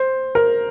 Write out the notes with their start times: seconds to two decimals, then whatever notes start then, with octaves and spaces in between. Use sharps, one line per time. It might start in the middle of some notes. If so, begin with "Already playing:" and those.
Already playing: C5
0.35 A#4